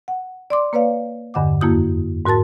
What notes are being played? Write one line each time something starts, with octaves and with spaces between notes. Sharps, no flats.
F#5
D5 C6 D6
A#3 B4 C#5 D5 F5
E2 G2 D3 D#5 F#5 D6
F2 A#3 E4 F#4 D#6 G6
G#2 F#4 A#4 A5 A6